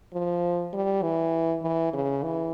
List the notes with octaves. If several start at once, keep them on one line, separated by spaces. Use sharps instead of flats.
F3
G3
E3
E3
C#3
E3